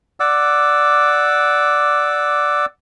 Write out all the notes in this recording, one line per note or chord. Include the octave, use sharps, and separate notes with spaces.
D5 F#5 D6 E6